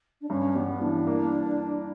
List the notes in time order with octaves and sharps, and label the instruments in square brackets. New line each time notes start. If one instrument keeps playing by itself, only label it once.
[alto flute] D4
[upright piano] G2 [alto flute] C#4
[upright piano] G3 [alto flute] B3
[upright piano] E3 [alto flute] D4
[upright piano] A#3